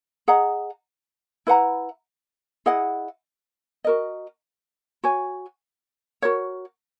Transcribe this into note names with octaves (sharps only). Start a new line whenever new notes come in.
G#4 D#5 F#5 A#5
E4 B4 F#5 A#5
E4 G#4 D#5 F#5
F#4 A#4 D#5
F#4 C#5 G#5
F#4 A#4 C#5